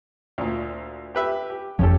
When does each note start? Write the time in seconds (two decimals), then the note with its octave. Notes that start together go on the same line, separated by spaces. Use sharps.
0.38 D2 A#2
1.15 G4 B4 E5
1.50 G4
1.79 F#1 F2 F3 C#4 G4 A4